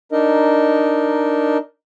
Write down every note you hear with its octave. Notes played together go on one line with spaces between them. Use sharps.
D4 D#4 A#4 D#5